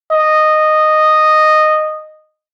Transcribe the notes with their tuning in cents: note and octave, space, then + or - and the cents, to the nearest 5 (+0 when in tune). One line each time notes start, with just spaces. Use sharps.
D#5 -10